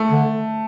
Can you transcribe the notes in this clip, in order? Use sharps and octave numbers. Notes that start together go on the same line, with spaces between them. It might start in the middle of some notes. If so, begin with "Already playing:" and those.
Already playing: A3
D3